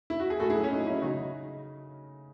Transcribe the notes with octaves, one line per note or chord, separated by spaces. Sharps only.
E4
F#4
G#4
A2 F#4 A4
E4 G#4
F#3
C#4
A2 D#4
F#3 C#4 E4
C#3 D#4 F#4